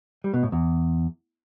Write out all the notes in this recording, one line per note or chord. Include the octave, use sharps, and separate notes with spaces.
G3
B2
A2
E2